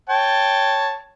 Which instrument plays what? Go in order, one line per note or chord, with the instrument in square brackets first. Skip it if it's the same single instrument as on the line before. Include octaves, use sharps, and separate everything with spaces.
[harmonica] C#5 G5 A5